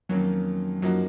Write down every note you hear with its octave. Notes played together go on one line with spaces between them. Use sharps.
F2 D#3 F#3 A#3 C#4
F#2 F3 F#3 A#3 D#4 F#4